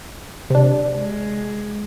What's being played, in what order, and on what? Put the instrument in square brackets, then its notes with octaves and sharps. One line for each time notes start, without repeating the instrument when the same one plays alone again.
[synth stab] C3 D4
[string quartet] G#3